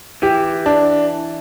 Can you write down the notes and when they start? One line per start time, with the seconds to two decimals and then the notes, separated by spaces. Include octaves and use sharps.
0.22 E3 G4
0.66 D4